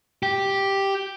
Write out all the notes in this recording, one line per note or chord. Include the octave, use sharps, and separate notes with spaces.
G4